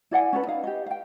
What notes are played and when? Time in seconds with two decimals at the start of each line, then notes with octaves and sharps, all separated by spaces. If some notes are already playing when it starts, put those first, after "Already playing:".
0.11 E4 D5 F#5 G#5
0.33 C#4 A4 B4
0.47 D#4 F5
0.64 G4 D#5
0.86 F5 G5